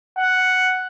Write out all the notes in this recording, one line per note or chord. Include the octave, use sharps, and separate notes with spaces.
F#5